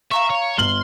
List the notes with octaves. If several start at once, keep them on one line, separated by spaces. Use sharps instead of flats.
E5 F5 A#5 C#6
C#5
G1 C6 F6 F#7